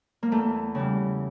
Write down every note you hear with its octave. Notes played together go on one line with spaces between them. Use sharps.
A#3
E2 A3
C#3 E3 G3